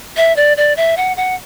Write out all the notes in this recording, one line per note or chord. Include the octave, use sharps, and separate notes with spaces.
E5
D5
D5
E5
F#5
F#5